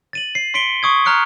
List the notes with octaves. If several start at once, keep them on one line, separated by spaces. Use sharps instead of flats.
A6 D#7 F#7
C7
C6 B6 C#7 D7 G7
C#6 D#6 G#6
A#5 F6 F#6 C#7